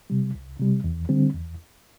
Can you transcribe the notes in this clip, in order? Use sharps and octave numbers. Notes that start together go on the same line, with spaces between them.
C3 G3
C2
C3 G3
E2
D3 G3 C4
E2